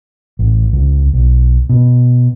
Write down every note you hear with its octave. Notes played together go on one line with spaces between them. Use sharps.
A1
C#2
B1
B2